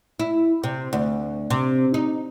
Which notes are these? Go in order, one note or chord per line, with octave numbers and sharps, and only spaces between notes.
E4
C3
D2
C3
D#4